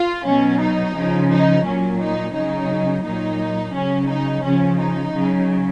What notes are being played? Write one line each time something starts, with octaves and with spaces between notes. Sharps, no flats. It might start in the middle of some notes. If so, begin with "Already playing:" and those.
Already playing: F4
B2 F#3 C#4
D#4
C#3 F3
D#4
A#2 F#3 C#4
D#4
C#3 F#3 D#4
A#2 F#3 D#4
C#3 F#3 C#4
D#4
C#3 F3 C#4
D#4
C#3 F#3